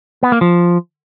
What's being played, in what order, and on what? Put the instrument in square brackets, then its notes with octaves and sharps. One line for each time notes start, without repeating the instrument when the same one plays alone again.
[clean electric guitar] B3
A#3
F3